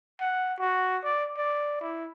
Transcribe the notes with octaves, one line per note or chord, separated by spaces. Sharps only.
F#5
F#4
D5
D5
E4